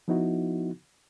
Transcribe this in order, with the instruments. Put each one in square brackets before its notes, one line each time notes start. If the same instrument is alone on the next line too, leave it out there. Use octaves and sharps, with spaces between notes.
[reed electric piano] F3 B3 D#4 E4 F#4